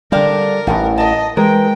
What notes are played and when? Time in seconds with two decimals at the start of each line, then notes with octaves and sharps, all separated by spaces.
0.12 D3 G3 C4 D4 A#4 F5
0.67 A1 D#3 E3 A3 B3
0.98 A#4 D#5 A5
1.37 E3 G#3 G#4 A#4 G5